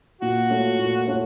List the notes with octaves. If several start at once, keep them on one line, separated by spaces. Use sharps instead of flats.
A#2 F#4
A3 C#4 F4
A#2
A3 C#4 F4